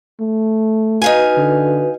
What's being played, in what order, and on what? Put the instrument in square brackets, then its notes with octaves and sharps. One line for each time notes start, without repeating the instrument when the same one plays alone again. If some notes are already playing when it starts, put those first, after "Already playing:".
[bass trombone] A3
[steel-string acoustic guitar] D#4 F5 G#5 [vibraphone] F#4 B4
[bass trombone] D3